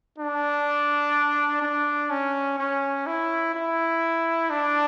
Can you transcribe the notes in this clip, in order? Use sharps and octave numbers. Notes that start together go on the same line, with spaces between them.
D4
D4
C#4
C#4
E4
E4
D4